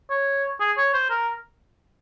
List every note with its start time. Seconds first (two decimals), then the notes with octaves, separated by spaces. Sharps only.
0.10 C#5
0.60 G#4
0.77 C#5
0.94 C5
1.10 A#4